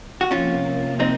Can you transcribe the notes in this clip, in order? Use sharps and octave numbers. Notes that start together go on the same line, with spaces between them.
F#4
C3 F3 A#3 C#4 F4
C4 D#4